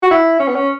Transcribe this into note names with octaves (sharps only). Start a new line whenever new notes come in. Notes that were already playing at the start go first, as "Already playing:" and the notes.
F#4
E4
C#4
B3
C#4